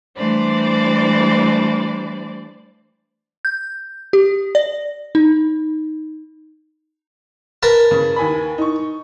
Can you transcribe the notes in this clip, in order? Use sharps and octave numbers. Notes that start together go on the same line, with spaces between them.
E3 G3 A3 D4 C5 D5
G6
G4
D5
D#4
A#4 B4 A5
C#3
D#2 G#5 B5
D#4 C#6